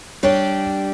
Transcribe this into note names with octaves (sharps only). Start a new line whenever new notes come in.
G3 D4 G4 C#5